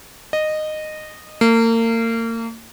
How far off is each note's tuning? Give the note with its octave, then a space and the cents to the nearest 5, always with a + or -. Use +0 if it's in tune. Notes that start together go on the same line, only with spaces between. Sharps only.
D#5 -15
A#3 -35